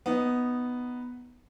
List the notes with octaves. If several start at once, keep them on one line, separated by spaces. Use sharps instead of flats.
B3 D#4